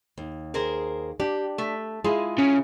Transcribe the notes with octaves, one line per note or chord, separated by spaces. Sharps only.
D#2
G#4 A#4 C5
D4 G4
A3
G#3 E4 F4 G#4
C#3